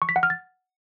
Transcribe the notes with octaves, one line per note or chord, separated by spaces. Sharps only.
C#6
B6
F#5
F6
A6